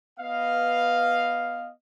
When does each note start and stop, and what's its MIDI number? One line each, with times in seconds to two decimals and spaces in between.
0.20 1.69 59
0.20 1.69 71
0.20 1.69 75
0.20 1.69 77